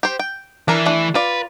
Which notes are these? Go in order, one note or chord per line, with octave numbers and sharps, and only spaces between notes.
G4 C5
G5
E3 D4 A#4
A3 D4
F4 B4 D5